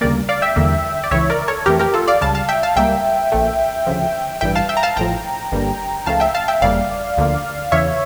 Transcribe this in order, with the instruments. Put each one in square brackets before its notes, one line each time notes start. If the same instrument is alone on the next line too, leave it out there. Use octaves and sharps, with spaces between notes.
[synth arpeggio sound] D2 C#3 G3 A#3 A#4 D5
D5 F5
E5 G5
E2 D3 G3 A#3
D5
C#2 C#3 E3 C#5 E5
A#4 D5
A4 C#5
F2 E3 A3 G4 A#4
G4 A#4
F4 A4
D5 F5
C#2 C#3 G3 F5 A5
F5 A5
E5 G5
F5 A5
C#2 C#3 G3 A#3 E5 G5
A#1 A#2 A3
D2 C#3 F3
A1 G2 E3 G3 E5 G5
F5 A5
E5 G5
A#5
F5 A5
A1 A2 F3 G5 A#5
G1 G2 D3 G3 A#3
C#2 C#3 F3 A3 F5 A5
E5 G5
F5 A5
E5 G5
G1 F2 C#3 G3 A#3 D5 F5
D2 D3 F3 A#3
E2 C#3 E3 C#5 E5